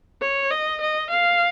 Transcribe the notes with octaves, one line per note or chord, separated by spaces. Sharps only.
C#5
D#5
D#5
F5